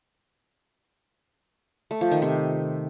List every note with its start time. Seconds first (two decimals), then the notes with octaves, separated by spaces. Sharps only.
1.91 A3
2.01 F3
2.12 D#3
2.22 C3